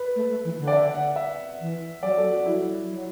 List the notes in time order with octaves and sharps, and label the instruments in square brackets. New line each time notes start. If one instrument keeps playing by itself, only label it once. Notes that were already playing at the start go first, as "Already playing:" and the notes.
Already playing: [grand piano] B4
[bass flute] A3
A3
E3
D3
[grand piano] D5
E5
F#5
E5
[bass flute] E3
[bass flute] F#3 [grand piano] D5
[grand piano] A4
F#4
[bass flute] F#3 [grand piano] E4
[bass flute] F#3
F#3